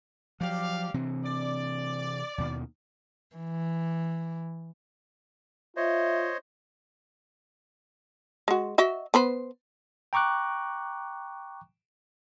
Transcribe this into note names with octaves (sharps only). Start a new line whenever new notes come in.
F3 F#3 G4 D5 F5
C3 E3 C4
D5
D#2 B2 D#3
E3
F4 C5 C#5 D#5 E5
G#3 F#4
F#4 D#5 E5
B3 B4 C5
G5 A#5 C#6 D6 F#6